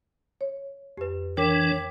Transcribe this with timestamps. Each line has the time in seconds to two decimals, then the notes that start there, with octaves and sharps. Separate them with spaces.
0.41 C#5
0.98 F2 G4 B4
1.37 E3 D4 A#4 C#5 G5 D6 B6